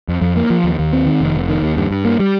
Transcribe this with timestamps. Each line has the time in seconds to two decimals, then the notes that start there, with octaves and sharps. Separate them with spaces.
0.08 F2
0.21 F2
0.37 A#3
0.50 F3
0.64 D#2
0.79 D#2
0.93 C4
1.06 D#3
1.21 F1
1.35 F1
1.49 D#3
1.63 D#2
1.77 G2
1.91 G2
2.05 A#3
2.20 G3